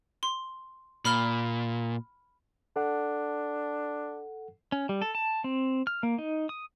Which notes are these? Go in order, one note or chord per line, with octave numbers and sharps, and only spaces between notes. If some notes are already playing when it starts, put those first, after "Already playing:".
C6
A#2 B5 F6 G7
D4 A4 F#5
C#4
G3
A4
A5
C4
F6
A#3
D#4
D#6